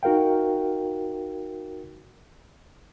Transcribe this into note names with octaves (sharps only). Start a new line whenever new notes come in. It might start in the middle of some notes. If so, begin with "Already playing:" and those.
D#4 F#4 A#4 F5 G5